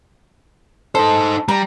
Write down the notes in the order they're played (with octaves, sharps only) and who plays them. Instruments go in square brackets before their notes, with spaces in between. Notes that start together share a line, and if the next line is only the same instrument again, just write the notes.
[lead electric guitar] D#4 C5 [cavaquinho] A4
[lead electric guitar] G3 [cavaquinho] A#5